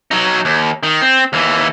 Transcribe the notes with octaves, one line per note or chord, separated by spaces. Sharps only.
F#3 D#4
D#2
D#3
C4
D#2 E3